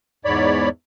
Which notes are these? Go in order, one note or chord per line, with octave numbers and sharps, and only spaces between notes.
E2 G#2 C#5 D5 B5